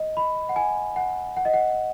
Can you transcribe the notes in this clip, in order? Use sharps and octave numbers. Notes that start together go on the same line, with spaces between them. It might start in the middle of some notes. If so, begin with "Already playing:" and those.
Already playing: D#5
B5
F#5
G#5
F#5
F#5
D#5
F#5